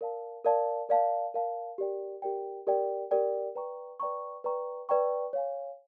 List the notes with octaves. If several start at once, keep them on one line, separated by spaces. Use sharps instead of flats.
A#4 D5 F5 A5
A#4 D5 F5 A5
A#4 D5 F5 A5
A#4 D5 F5 A5
G4 A#4 D5 G5
G4 A#4 D5 G5
G4 A#4 D5 G5
G4 A#4 D5 G5
B4 D5 G5 A#5 C#6
B4 D5 G5 A#5 C#6
B4 D5 G5 A#5 C#6
B4 D5 G5 A#5 C#6
C#5 F5 G#5